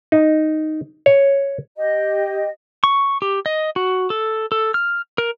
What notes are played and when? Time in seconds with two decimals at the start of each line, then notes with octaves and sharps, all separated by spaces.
0.12 D#4
1.06 C#5
1.76 G4 D#5
2.84 C#6
3.22 G4
3.46 D#5
3.76 F#4
4.10 A4
4.52 A4
4.74 F6
5.18 A#4